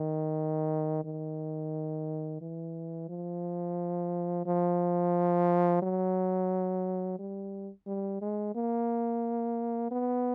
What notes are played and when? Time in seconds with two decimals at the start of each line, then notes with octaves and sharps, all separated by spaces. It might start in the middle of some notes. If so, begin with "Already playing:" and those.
Already playing: D#3
1.05 D#3
2.41 E3
3.09 F3
4.46 F3
5.82 F#3
7.19 G3
7.87 G3
8.21 G#3
8.55 A#3
9.91 B3